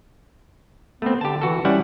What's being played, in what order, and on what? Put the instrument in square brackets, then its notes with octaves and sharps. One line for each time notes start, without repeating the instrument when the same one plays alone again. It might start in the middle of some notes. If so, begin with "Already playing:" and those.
[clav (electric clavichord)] A3 C4 [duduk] B3
[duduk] D3 [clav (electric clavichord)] G4 A5
[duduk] E3 [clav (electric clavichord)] F#4 A4
[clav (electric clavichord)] G3 E4 F#5 [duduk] C#4